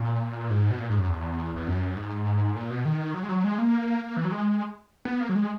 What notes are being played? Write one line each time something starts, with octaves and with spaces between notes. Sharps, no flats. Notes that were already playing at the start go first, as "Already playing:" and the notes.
Already playing: A#2
G#2
B2
A#2
G#2
F#2
E2
E2
F#2
G#2
A#2
B2
D#3
F#3
G#3
F#3
G#3
A#3
E3
F#3
G#3
B3
A#3
F#3
G#3